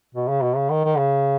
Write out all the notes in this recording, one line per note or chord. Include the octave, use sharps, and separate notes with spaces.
B2
C#3
B2
C#3
D#3
D#3
C#3